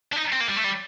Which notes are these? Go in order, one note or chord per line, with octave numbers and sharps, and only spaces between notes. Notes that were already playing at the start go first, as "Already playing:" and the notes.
D4
D#4
C4
A#3
G3
A3
G3